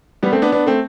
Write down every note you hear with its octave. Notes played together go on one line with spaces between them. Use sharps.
G3 B3
A3 C4
B3 D4
B3 D4
A3 C4